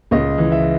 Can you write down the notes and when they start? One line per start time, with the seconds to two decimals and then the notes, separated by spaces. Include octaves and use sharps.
0.11 C#2 D#5
0.38 E3
0.52 E5